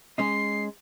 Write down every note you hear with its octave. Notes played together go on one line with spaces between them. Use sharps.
G#3 C#4 D#4 C7